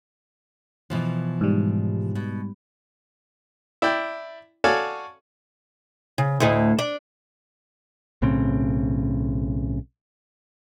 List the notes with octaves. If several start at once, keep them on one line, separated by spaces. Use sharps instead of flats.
B2 E3 F3
G#2 G3
B2
E4 D5 G5
F#4 A4 C#5 D5 F5 G#5
C#3
D2 A2 D#5
D4
B1 A2 C#3 C4